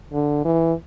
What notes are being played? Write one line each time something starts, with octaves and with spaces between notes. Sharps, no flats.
D3
E3